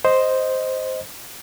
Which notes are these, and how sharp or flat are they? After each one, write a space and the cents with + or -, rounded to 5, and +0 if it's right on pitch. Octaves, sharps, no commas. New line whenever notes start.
C5 +0 D#5 +0